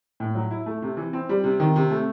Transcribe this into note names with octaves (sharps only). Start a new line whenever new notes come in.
A2
F#3
E4
A3
C3
E3
C4
G3
C3
D#3
C3
A3